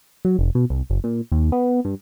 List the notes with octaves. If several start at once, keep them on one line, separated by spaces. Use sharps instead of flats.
F#3
F1
B2
C2
F#1
A#2
D#2
B3
G2